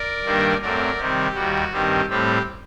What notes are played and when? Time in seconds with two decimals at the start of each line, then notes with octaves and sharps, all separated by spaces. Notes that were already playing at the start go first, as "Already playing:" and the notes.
Already playing: A#4 D5
0.24 G2 D#3 G3 A#3 D4
0.61 F#2 F#3 A3 C4 A#4 D5
0.98 C3 D#3 G3 C4 G4
1.34 D#2 D#3 G3 F#4
1.72 G2 D#3 G3 C4 G4
2.09 A2 G3 C4 G4